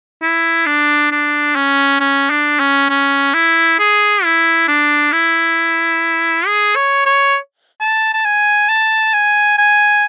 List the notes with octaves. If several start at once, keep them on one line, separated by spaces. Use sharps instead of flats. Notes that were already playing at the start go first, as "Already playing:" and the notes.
E4
D4
D4
C#4
C#4
D4
C#4
C#4
E4
G#4
E4
D4
E4
G#4
C#5
C#5
A5
A5
G#5
A5
G#5
G#5